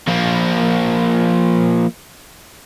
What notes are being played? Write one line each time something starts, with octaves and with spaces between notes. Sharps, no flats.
F3 A#3